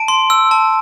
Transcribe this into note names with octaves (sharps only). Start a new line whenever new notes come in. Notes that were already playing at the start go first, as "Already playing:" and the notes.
Already playing: A5 D7
C6
E6
A5